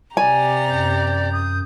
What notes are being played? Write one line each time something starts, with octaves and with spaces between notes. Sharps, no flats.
C3 G4 D5 G#5 A#5
F#2 G6
D#6